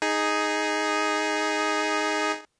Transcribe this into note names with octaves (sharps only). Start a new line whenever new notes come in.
D#4 G#4